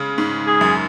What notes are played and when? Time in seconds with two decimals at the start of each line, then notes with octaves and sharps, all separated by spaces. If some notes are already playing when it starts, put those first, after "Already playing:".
Already playing: C#3 G#3
0.18 G#2
0.47 G#4
0.61 F#2